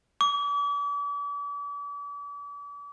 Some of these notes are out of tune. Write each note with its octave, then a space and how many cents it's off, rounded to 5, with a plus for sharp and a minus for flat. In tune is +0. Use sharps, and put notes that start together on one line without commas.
D6 -40